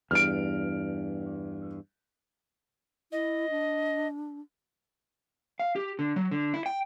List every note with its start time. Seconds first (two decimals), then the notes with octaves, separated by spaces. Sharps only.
0.11 E2 G2 F6 D7
3.12 E4 D#5
3.50 D4
5.60 F5
5.76 G4
5.99 D3
6.16 F#3
6.31 D3
6.54 E4
6.66 G5